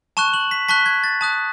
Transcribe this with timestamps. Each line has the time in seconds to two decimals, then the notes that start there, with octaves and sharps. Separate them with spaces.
0.17 A5 C#6 F#6 E7
0.34 F#7
0.51 B6
0.69 A5 C#6 F#6 B6
0.86 G#6
1.04 A6
1.21 A5 D#6 F#6